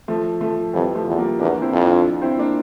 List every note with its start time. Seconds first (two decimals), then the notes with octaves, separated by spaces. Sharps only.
0.08 F3 A3
0.41 F3 A3
0.73 F2 E3 G3
0.95 F3 A3
1.07 E2
1.18 G3 A#3
1.39 E2 A#3 D4
1.61 C4 E4
1.73 F2
1.84 D4 F4
2.22 C4 E4
2.39 A#3 D4